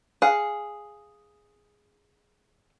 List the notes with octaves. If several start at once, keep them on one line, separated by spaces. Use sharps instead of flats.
G#4 F5 F#5